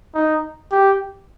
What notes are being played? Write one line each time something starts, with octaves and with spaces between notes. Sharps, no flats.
D#4
G4